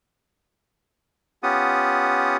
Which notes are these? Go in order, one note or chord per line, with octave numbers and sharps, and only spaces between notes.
B3 C#4 F4 G4 F#5 D#6